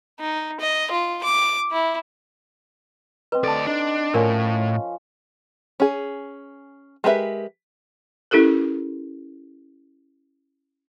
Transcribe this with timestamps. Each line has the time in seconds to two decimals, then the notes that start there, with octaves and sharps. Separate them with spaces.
0.20 D#4
0.60 D#5
0.91 F4
1.24 D6
1.72 E4
3.32 C4 B4 D#5
3.43 D2 A4 D5 A5
3.67 D4 D#4 D#5
4.14 A2 F3 C#4 A#4 D5
5.80 C#4 G#4
7.04 G#3 G4 A#4 B4 E5
8.31 C#4 E4 G4 A4 A#4